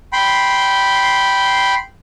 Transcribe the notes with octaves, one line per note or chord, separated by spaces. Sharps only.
G5 B5 C6